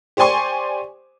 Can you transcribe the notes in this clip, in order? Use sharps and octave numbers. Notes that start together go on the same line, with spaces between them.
G4 C5 D5 G#5 C6 C#6